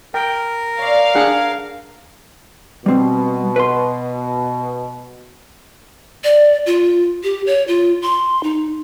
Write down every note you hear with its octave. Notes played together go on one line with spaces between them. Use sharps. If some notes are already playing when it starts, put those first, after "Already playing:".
A#4 G5
C#5 D5 F5
D4 G#4 F#5
B2 G3 C4
B4 C6
D5
F4
G4
C#5
F4
C6
D#4